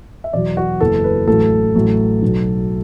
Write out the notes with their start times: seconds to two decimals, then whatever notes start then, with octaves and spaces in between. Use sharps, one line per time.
0.24 E5
0.33 E2 B2 F#3 D5
0.57 F#4
0.80 F#1 E2 E3 A4
1.04 B4
1.28 A1 A2 F#3 A4
1.75 A1 A2 F#3
2.22 B1 B2 F#3